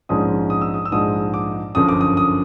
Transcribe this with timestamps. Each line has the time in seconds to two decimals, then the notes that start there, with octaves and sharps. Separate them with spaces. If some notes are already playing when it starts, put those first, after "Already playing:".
0.09 A#1 G#2 F3 G#3 C#4 D#6
0.50 D#6
0.61 E6
0.74 D#6
0.85 E6
0.92 A#1 G#2 F3 G#3 D#6
1.34 D6
1.75 G1 F#2 D3 F3 D#6
1.88 D6
2.01 D#6
2.17 D#6